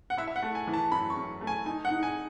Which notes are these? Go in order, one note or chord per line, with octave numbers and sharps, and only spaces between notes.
F#5
E4 E5
E5
F#5
A3
G#5
E3
A5
F#2 B5
C#6
F#2
A3
G#5
D#4 G#5
F#5
D#4
G#5